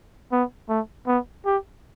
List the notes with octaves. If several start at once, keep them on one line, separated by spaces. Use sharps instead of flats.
B3
A3
B3
G4